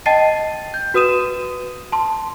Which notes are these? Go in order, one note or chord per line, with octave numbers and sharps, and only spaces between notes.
D#5 G5 A5 A6 C7 D#7
G6
F#4 B4 D#6 D#7 E7
A5 C6